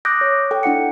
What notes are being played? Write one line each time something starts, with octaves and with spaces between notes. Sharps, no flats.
D6 D#6 F#6 G6 A#6 D7
C#5
A4 G5
D4 E4 F#5 C#7